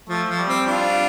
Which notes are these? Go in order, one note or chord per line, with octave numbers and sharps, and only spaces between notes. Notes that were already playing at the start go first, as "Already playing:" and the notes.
F3 A3
F3
G3
C4
D4 F4